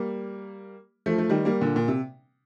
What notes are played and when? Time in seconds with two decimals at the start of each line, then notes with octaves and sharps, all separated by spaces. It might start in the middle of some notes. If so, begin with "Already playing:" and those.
Already playing: G3 A#3
1.06 F3 A3
1.18 A3
1.29 D#3 G3
1.45 G3 A#3
1.61 A#2 D3
1.76 A#2
1.88 C3